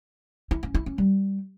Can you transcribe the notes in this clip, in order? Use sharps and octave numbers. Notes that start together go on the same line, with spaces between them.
E4
C#4
E4
C#4
G3